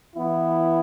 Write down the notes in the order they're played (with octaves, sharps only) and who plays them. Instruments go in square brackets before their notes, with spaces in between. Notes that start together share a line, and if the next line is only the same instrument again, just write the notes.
[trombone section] E3 B3 E4